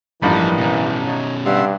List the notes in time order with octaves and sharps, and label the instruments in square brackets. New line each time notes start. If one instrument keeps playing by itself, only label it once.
[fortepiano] A1 G2 B5 [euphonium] E3 [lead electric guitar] F3 [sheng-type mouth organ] A#3 B4 D#5
[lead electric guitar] B2 C#4
[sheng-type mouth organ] D#4 C#5
[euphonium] G2 [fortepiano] G3 [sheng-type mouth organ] E5 F#5 C6